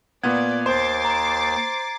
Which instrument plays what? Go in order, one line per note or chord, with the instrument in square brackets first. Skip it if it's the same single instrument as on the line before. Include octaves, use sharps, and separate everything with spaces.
[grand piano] A#2 B3 [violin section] D5 [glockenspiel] G#6
[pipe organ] D#2 [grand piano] C5 [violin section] D6 A6 C7
[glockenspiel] A#5